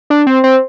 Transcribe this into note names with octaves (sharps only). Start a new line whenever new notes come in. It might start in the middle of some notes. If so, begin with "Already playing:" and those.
D4
C4
C4